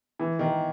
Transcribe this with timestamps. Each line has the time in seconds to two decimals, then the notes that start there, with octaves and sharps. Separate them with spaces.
0.19 E3
0.39 D#3